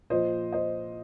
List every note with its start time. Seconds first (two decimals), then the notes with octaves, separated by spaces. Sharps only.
0.10 A#2 F3 C5 D#5
0.52 C5 D#5